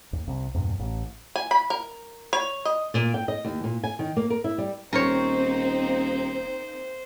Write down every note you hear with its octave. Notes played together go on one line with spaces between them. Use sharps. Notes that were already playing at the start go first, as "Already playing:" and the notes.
D#2
C2
E2 G2 A#2
A1
G#5
B5
A#4
C#5
D#5
A#2
G5
D#5
D#2
A#2
G#5
D#3
A#3
A#4
E4
G3
D#1 A#3 C4 D#4 A#4 C5 C#5